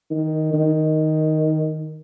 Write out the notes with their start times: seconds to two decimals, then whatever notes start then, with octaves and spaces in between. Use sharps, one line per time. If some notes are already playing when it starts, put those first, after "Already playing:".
0.11 D#3
0.54 D#3